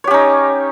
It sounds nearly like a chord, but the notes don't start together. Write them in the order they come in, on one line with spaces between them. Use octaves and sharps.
C#5 G4 C#4 D#4